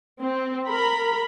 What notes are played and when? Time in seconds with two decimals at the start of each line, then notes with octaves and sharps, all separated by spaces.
0.21 C4
0.66 A#4 A#5 B5